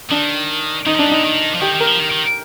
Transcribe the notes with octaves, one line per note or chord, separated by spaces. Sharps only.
D#3 D4
D#3 D#4
F3 D4
G3
D3 D#4
D#3
F3
D#3 G4
D#3
A#4
F3
D#3
D#3